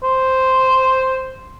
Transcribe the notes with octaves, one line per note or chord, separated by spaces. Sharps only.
C5